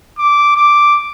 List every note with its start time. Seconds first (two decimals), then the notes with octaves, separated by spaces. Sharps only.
0.19 D6
0.56 D6